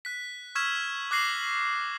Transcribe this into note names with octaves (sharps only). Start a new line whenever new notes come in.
F#6 B6
C#6 E6 F6 G#6 B6 E7
D6 F#6 A#6 C7 F#7